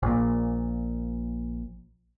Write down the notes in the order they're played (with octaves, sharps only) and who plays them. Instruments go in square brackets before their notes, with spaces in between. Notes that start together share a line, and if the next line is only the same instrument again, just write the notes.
[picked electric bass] A#1 A#2